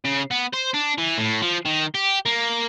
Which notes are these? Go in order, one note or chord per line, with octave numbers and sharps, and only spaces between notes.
C#3
B3
C5
D4
E3
A2
F3
D#3
G4
A#3